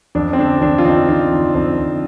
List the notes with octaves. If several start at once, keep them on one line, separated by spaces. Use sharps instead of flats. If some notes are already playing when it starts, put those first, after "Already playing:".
F2 D4
C4
D3 D4
F2 D4
F4
F2 C4 D#4
F2 D4
F2
F2 C4
F2